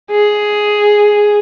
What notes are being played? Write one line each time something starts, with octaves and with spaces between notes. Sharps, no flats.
G#4